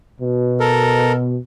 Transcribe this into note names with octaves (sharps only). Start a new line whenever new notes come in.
B2
A4 A#4